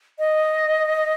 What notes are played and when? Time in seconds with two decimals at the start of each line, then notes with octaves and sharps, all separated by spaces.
0.19 D#5